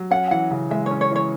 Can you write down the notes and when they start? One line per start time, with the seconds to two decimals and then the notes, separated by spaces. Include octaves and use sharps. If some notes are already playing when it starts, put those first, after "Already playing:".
Already playing: F#3
0.11 C#4 F#5
0.31 E3 F#5
0.51 C#3
0.71 G#3 E5
0.86 C#5
0.91 C#4
1.01 C#5
1.11 E3 C#5